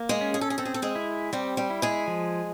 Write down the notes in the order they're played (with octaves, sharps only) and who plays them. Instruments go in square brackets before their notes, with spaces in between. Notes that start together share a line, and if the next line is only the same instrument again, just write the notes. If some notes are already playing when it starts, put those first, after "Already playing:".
Already playing: [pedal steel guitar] A#3
[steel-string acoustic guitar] G#3 G#4
[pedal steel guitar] C#4
[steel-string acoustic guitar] G#4
A4
G#4
[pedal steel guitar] C4 [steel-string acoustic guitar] A4
[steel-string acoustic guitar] G#4
A4
G#3 G#4
[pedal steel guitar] E4
[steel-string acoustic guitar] G3 G4 [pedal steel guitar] C4
[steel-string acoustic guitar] G3 G4
[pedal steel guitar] E4
[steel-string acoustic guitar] G#3 G#4
[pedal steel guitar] F3